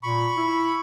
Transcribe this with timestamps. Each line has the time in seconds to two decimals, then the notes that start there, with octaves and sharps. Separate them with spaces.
0.03 A#2 B5 C#6
0.37 E4